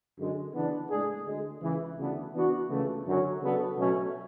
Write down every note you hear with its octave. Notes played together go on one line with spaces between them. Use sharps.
F#2 D3 G#3
C#3 E3 B3 D4
A2 G#3 D4 G#4
D2 D3 G#3
C#2 C#3 E3
D2 C#3 E3 B3 D4
E3 B3 D4 F#4
C#2 C#3 E3 A3
F#2 D3 F#3 C#4
C#3 F#3 B3 D4 A4
B2 F#3 A3 C#4